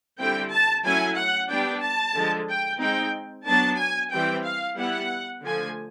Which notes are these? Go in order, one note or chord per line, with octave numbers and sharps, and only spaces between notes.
D3 G3 C4 E4 G5
A5
F#3 A3 C#4 E4 G#5
F#5
G3 B3 D4 G5
A5
D3 F3 G#3
G5
G#3 C4 D#4 G5
F#3 B3 D4 A5
G#5
E3 G3 C4 G5
F5
G3 B3 E4 F#5
D3 F3 A3 G#5